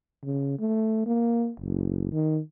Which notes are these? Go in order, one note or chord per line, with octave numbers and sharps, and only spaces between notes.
C#3
A3
A#3
F#1
D#3